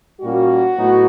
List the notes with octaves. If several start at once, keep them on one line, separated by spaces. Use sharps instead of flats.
A#2 G3 A#3 C#4 F#4
A2 F#3 B3 D#4